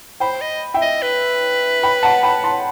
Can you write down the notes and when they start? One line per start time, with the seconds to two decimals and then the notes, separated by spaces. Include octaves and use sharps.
0.20 C5 G5 B5
0.41 D#5
0.74 E5 G5
0.82 D#5
1.02 B4
1.83 G5 B5
2.03 F#5 A5
2.23 G5 B5
2.44 A5 C6